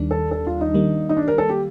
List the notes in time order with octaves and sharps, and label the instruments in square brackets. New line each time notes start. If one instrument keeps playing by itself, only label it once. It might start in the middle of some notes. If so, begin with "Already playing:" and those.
Already playing: [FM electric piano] D#2 D#3 G3 D4
[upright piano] A4
A4
F4
D#4
[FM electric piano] D#3 G3 A#3
[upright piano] D#4
D4
A#4
A4
G4